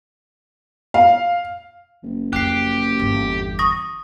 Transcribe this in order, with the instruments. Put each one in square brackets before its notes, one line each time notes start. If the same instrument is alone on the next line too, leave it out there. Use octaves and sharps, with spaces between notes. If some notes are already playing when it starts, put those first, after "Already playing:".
[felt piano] F5
[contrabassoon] F#1
[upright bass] F2 [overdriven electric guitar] G4 [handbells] F#6 C7
[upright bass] G1 E2
[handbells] C#6 D#6 A#6